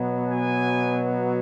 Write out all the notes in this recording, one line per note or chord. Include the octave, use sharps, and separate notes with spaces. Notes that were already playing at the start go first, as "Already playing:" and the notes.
Already playing: B2 F#3 B3
G#5